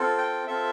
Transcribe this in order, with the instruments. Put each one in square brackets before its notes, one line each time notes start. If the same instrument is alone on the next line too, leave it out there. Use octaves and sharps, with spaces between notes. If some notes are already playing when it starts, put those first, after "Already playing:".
Already playing: [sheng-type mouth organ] C4 F4 A4
G5
C4 F4 A4 E5